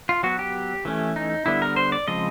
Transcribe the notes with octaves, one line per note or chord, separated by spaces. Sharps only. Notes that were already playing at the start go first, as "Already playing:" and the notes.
F4
F#3 B3 F#4
G4
E3 A3 C#4
D#4
D3 G3 B3 E4
A#4
C5
D5
C#3 F3 G#3 C4 D#5